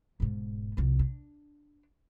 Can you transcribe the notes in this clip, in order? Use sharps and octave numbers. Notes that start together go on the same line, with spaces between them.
E1 G#2
C2 F2
D4